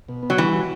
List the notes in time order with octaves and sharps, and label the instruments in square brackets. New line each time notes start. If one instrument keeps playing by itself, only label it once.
[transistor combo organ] B2
B3
[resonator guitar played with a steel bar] F#3
[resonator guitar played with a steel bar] E3 [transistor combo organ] G3
[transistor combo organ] F#4